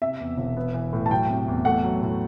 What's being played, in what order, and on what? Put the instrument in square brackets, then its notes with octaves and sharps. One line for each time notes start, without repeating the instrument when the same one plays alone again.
[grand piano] C3 [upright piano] E5
[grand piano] E2
E1
B3
E3
A2
[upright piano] A5
[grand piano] F#3 [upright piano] G5
[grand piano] C3
E2
[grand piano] A3 [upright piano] F#5
[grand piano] F#3
A2